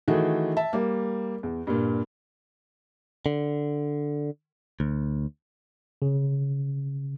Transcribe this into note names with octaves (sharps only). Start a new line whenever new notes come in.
D#3 E3 A3 F#4 G#4
E5 A5
G3 A#3
E2
G2 A#2
D3
D2
C#3